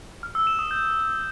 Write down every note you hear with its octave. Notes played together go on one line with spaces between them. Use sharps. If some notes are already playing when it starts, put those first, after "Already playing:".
F6
E6
E7
D#6
G6